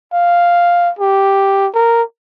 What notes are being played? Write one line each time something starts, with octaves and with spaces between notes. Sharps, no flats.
F5
G4
A#4